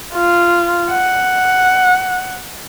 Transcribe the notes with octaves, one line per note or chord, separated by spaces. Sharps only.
F4
F#5